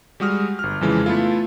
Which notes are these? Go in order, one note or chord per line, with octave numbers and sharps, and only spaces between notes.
G3 G#3 F#4 D#6 F6
G1 F6
F2 C#3 E3 G#3
A3 B3 E4 F4 A4